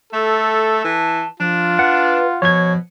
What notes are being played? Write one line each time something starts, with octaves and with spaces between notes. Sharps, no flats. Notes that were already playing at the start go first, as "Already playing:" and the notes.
A3 A4
E3 A5
F3 D4 F4
B4 F#5
B2 F3 C#5 G#6